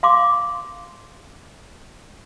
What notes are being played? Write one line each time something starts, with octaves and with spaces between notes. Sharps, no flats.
F5 C6 D6